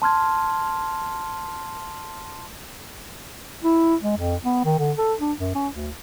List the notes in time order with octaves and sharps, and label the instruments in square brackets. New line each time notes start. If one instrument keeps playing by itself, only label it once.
[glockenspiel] A5 C6 F6 G#6
[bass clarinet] E4
G#3
F2
B3
D#3
D3
A4
D4
F#2
C#4
D2